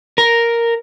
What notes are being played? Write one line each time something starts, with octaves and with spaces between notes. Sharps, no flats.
A#4